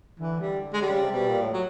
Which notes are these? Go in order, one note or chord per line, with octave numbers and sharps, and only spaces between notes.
D3 E3
G3
G#3
G3
C#3
C3
B2 G3
A#2
A2
F#3